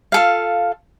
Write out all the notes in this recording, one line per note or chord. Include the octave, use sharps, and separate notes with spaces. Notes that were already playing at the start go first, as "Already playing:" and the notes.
F4 A4 F5